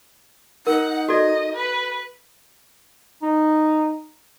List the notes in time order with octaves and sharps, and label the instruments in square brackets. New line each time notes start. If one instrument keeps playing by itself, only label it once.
[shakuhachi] D#4 [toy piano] A#4 [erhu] F#5
[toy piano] F#4 A4 D5 [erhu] D#5
[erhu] B4
[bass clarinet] D#4